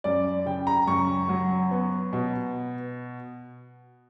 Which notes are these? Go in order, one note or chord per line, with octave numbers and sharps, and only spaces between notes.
F#2 D5
C#3 G5
A#5
F#2 C#6
F#3
B3
B2